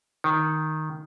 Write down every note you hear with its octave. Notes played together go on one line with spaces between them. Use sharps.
D#3